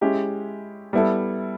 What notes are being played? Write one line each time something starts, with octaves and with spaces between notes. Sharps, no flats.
G#3 C#4 E4 G4
G3 B3 E4 A4